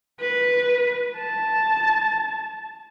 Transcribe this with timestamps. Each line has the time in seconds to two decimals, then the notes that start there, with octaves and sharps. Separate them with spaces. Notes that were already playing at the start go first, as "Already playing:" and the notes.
0.20 B4
1.17 A5